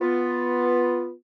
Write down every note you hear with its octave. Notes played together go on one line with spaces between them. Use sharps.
B3 F4